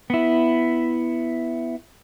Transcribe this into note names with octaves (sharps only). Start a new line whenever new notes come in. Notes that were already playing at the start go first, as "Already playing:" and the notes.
B3 E4